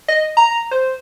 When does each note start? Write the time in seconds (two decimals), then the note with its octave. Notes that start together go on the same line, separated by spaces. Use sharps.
0.08 D#5
0.37 A#5
0.71 C5